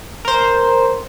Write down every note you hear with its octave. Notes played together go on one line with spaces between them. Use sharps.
A#4 C5